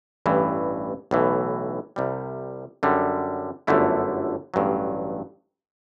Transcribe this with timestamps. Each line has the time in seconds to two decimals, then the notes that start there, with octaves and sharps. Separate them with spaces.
0.26 A1 G2 E3
1.11 B1 A2 E3
1.96 C2 C3 G3
2.83 F#2 D3 G3
3.67 G1 F#2 D3 A3 E4
4.54 A1 G2 F#3